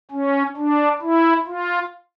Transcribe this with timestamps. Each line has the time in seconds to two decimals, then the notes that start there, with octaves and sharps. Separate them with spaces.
0.11 C#4
0.57 D4
1.02 E4
1.47 F4